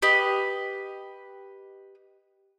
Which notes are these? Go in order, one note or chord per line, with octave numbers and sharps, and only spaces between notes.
G4 B4 D#5